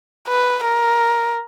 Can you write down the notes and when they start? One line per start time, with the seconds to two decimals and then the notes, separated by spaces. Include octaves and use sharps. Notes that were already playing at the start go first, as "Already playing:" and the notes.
0.28 B4
0.65 A#4